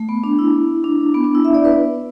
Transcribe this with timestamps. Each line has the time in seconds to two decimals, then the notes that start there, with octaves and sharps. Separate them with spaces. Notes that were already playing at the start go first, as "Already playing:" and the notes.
Already playing: A3
0.09 B3
0.24 D4
0.39 E4
0.84 D4
1.14 B3
1.24 D4
1.35 E4
1.45 E5
1.54 D5
1.65 B4